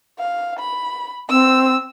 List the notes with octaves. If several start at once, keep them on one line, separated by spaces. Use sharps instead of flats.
F5
B5
C4 E6